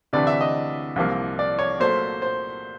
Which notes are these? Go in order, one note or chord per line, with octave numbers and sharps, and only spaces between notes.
D2 C3 E3 D5
E5
D#5
C2 C3 F3 A#3
D5
C#5
A#2 F#3 A3 C5
C5